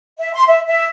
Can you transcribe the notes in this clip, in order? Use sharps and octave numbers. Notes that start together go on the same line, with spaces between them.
E5
C6
E5
E5